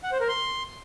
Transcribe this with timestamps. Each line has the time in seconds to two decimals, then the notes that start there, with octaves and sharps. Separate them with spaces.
0.03 F#5
0.12 C5
0.20 A#4
0.29 C6